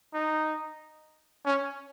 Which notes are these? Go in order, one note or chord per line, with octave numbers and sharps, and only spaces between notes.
D#4
C#4